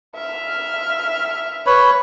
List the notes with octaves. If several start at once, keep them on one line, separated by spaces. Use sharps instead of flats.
E5 F6
B4 C#5 B5